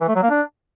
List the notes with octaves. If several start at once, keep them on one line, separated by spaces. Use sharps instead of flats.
E3
A3
F#3
A#3
D4